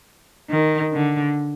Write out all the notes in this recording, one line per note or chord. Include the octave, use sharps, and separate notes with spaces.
D#3
D3